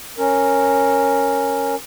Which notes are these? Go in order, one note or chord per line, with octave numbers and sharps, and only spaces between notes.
C#4 A#4